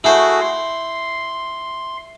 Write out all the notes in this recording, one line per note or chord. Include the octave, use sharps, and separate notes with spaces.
A3 E4 F#4 G#4 C5
C6